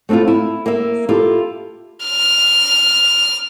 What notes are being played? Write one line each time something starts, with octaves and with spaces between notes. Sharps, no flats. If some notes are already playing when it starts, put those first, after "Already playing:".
A3 C4 D4 E4 F4
E4
A#3 E5
E4 F4 G4 A4
F6